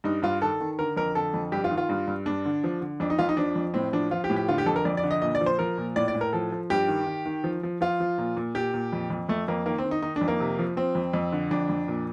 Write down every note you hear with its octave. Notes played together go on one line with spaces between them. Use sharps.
G2 D#4
G2 F4
D#3 A4
D#3
D3 A#4
F2 A#4
D3 A4
F2
G2 G4
F4
D#3
F4
G2
G2
G2 D4
D3
F3
D3
F2 D4
D#4
F2 F4
D#4
F3 D4
F2
A2 C4
F3 D4
F3 F4
G4
A2
G4
D3 F4
G4
F2 A4
A#4
F2 D5
D5
D3
D#5
A#2 D#5
D5
F3
C5
F3 A#4
A#2
A2 D5
D5
A2
A#4
F3 A4
F3
G2 G4
D#3
D#3
D#3
F3
F3
F3 F4
F3
A#2
A#2
A#2 G4
A#2
F2
F2
F2 A3
F2 A#3
D#3 A#3
C4
D#3
D#4
D#3 D#4
D4
F2
A#3
C3
F3
F3 C4
F2
F2
D3
F2 D4
F2
A#2